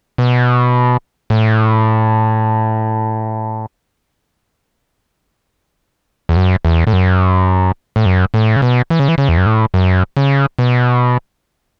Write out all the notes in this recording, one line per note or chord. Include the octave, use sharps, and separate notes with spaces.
B2
A2
E2
F#2
E2
A2
F#2
A2
F#2
A2
C#3
B2
E3
C#3
E3
C#3
E2
F#2
A2
F#2
C#3
B2